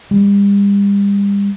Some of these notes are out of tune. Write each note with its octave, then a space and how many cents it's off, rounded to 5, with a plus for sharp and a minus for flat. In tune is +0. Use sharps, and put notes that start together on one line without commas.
G3 +40